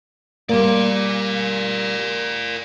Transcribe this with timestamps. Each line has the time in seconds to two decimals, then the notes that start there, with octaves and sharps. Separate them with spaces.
0.49 G3 A#3 A#4 D5